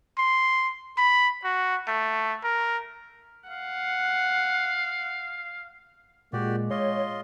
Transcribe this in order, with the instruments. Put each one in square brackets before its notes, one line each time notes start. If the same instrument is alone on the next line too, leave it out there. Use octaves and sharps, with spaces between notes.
[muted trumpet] C6
B5
F#4
A3
A#4
[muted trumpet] F5 [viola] F#5
[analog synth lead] A#2 [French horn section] G#3 [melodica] F#4 G4 D5
[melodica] F4 D#5 C6 [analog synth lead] C#5